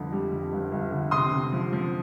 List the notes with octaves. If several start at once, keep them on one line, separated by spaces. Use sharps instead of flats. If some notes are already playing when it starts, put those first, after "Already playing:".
Already playing: G1 F2 D3
G3
F2
G1
G1
D3
C3 C6 D#6
C3
F3
F3